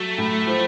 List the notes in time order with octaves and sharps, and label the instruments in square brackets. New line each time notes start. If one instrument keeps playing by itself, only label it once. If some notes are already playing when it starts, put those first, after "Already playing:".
Already playing: [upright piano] F#3 [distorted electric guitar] A3
[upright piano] A2
F3